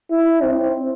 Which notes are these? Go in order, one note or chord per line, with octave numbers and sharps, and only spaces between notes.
E4
C4